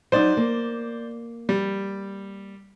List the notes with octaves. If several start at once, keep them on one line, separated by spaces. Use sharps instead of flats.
F#3 D#4 C5 D5
A#3
G3